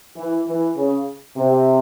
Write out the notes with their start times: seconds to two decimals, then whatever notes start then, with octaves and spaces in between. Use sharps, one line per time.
0.17 E3
0.47 E3
0.77 C#3
1.37 C3